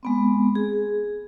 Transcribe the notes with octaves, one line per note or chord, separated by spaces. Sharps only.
G#3 B3 C4
G#4